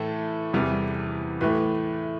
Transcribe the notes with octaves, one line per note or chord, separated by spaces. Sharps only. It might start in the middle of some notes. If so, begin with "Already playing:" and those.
Already playing: A2 E3 A3 A4
E2 C3 E3 G3
A2 E3 A3 B4 B5